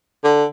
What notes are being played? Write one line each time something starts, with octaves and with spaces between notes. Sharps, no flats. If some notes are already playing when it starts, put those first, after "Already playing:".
D3